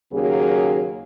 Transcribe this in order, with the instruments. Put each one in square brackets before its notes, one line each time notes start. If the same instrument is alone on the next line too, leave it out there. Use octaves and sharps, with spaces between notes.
[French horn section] D#2 C#3 F#3 A#3 G#4